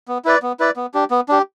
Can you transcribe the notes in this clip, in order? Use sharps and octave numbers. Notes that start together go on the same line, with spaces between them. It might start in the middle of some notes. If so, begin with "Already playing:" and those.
B3
E4 B4 D5
B3
E4 B4 D5
B3
D4 G4
B3
D4 G4